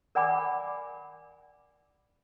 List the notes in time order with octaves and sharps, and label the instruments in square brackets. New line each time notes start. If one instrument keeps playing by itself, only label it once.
[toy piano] A#4 D5 F#5 G#5 B5 D6